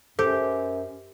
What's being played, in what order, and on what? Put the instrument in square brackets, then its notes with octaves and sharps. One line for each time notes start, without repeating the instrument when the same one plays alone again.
[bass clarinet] F#2 [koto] G4 [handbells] A4 [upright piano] C5